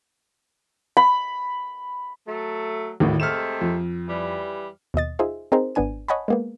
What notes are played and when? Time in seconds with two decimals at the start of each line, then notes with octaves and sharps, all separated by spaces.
0.97 B5
2.26 F#3 A3
3.00 G#1 D#2 A2
3.20 C3 G#3 A3 F6 E7
3.61 F2
4.08 E3 G3
4.94 D#2 B2 D#5 A6
5.19 D#4 F4 G#4 C5 E5
5.52 C4 D#4 G#4 A#4 C5
5.75 G#1 B3 D4 G#5 D#7
6.08 C#5 D#5 F#5 G#5 A5 B5
6.28 G#3 A#3 B3